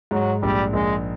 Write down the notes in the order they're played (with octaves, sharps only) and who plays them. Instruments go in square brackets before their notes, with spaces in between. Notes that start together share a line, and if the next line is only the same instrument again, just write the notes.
[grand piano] G#2 [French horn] F#3
[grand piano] A#1 [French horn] G3
[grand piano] A#1 [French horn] G#3